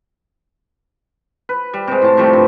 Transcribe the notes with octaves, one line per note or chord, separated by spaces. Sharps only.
B4
G3
C3 G#3
A2 A5
C3 F3 G3 A3
G2